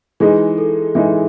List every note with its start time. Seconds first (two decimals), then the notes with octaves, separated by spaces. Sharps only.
0.20 E3 G#3 D#4 G#4
0.58 A4
0.95 E3 G#3 D#4 E5